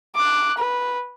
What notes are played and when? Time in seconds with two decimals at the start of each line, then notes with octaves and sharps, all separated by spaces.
0.16 D6 F#6
0.58 B4